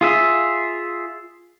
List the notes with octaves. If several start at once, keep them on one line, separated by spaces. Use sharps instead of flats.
F4 G#4 E5